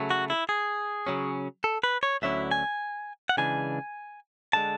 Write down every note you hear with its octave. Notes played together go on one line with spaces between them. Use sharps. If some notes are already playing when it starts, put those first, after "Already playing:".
Already playing: C#3 F#3 A3
F#4
E4
G#4
C#3 F#3 C#4
A4
B4
C#5
D2 D3 F#3 C#4 E4 E5
G#5
F#5
C#3 E3 G#3 D4 G#5
D3 G#3 A5